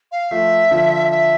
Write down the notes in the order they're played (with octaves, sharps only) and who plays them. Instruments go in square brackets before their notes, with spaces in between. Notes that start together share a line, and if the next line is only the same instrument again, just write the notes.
[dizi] F5
[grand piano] F3 A3 [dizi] E5
[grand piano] D3 F3
[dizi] E5